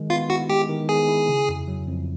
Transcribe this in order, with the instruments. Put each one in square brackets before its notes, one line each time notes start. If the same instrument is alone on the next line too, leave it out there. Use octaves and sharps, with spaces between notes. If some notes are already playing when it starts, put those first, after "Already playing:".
Already playing: [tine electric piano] D#3 G#3
[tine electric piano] B3 [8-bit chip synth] F4 F5
[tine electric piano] E4 [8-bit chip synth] F#4 F#5
[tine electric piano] G#3 [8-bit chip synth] G4 G5
[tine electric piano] D#3
[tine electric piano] B3 [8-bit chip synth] G#4 G#5
[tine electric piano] E4
C#3
F2
F#3
F2